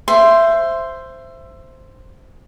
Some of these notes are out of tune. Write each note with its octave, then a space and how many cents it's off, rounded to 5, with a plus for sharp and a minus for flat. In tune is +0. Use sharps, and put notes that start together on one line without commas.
C5 +0 E5 +20 C6 +0